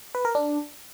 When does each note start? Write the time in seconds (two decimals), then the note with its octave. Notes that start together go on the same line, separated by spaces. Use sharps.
0.15 B4
0.25 A#4
0.35 D4